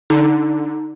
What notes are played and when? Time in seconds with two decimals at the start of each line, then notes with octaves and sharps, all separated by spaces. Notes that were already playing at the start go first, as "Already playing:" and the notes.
0.10 D3 D#4